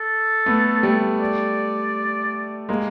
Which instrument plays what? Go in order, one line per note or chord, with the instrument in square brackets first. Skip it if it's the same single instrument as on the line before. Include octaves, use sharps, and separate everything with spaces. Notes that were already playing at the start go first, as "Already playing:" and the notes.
Already playing: [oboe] A4
[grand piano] A3 B3
G3 A3
[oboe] D5
[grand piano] G#3 A#3